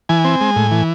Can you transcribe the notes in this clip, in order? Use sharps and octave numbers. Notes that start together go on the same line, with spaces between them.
E3 G#5
C4
G#3
A2
E3